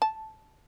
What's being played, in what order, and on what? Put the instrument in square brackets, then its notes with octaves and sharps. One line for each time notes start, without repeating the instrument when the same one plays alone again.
[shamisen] A5